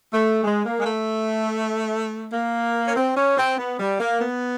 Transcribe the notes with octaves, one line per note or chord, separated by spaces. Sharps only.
A3
G#3
A#3
G#3
A3
A#3
C#4
C4
C#4
C4
B3
G3
A#3
B3